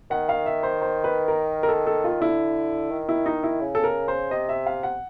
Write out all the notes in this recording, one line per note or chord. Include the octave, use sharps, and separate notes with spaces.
D#3 F#5
F5
E5
C5
C5
B4
A#4
A#4
A4
A4
F4
D3 E4
D#3
E4
D#4
E4
C#3
A4
A#4
C5
C3 D#5
E5
F5
F#5